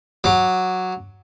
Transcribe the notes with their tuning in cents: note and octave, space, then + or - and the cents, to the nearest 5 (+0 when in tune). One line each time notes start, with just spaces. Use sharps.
F#3 -5 D6 +15